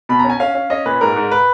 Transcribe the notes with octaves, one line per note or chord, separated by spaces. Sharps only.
B2 B5
C#4 A#5
G#5
C#4 F5
C#4
C#4 D#5
A#2 B4
G#2 A#4
G#2
B4